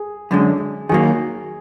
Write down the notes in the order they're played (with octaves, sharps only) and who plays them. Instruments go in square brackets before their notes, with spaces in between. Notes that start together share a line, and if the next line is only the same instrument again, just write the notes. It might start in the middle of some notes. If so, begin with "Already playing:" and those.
Already playing: [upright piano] G#4
[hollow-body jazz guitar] F#2 D3 G#3
[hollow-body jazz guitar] D#3 F#3 A#3 [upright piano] G#4